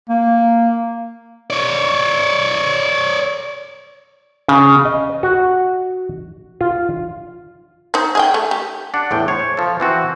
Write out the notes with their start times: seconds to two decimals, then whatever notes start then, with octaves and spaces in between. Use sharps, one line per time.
0.09 A#3
1.50 C#5 D5
4.48 C#3
4.85 D#5
5.23 F#4
6.61 F4
7.94 D#4 C5
8.15 G#4 D#5 G5
8.34 A3
8.51 G4
8.94 D4 F#5
9.11 E2 A2 G5
9.28 C5 C#5
9.57 F3 A4
9.80 E3 C4 F#4